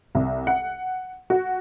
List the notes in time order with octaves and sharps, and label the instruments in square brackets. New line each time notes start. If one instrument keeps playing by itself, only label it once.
[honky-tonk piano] C2
F#5
F#4